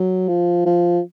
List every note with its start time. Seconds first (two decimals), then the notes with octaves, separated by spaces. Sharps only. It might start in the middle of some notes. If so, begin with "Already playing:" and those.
Already playing: F#3
0.28 F3
0.65 F3